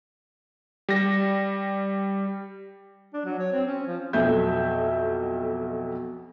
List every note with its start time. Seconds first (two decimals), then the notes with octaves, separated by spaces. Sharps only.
0.89 G3 A#6
3.14 D4
3.25 F#3
3.39 C#5
3.52 C4
3.67 C#4
3.86 F3
4.13 B1 F2 B2 A4 E5 G6